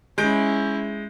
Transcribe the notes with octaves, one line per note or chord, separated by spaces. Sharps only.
G#3 C#4 E4 G6 D7